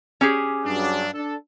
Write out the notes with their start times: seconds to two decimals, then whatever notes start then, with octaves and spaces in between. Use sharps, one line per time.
0.21 C#4 G4 G#4
0.65 G2 F#3 D4
1.14 D4 A4